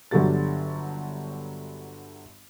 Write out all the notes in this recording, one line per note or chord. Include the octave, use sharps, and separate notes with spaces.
G1 D3 F#3 D4 G4 A6